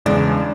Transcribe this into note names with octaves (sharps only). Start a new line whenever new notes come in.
E2 C#3 G#3 D4